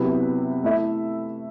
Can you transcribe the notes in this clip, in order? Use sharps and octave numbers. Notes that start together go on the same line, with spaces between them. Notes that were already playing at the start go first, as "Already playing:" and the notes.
Already playing: C3 F#3 B3 E4 B4
A3 E4 A4 E5